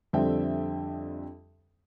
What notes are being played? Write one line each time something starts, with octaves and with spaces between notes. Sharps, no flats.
F2 D3 G3 C4 E5 G5